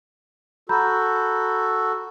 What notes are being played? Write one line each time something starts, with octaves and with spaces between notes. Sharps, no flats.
F#4 A4 A#5 B5 G6